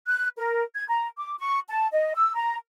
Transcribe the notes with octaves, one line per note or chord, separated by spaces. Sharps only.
F#6
A#4
G#6
A#5
D6
C#6
A5
D#5
E6
A#5